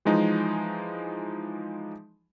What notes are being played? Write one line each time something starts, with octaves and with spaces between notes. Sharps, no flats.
E3 F3 G#3 D#4